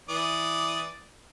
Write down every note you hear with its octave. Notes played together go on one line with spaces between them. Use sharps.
E3 D5 D#6